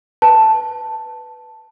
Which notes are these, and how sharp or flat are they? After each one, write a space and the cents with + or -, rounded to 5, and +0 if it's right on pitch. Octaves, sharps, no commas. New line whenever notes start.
B4 +0 A5 +0